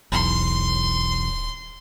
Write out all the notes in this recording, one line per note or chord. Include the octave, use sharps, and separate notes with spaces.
D1 B1 E2 C6